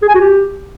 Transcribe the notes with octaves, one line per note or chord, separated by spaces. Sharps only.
G#4
G#5
F#4
G4